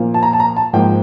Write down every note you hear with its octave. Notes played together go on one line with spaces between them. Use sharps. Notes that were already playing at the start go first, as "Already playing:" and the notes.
Already playing: A#2 F3 A#3
A5
A#5
A5
A#5
A5
G#2 F3 A#3 G5